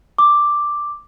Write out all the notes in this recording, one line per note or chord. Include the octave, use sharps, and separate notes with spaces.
D6